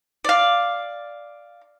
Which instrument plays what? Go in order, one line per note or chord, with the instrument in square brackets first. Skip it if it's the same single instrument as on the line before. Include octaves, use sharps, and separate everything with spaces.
[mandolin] D5 F5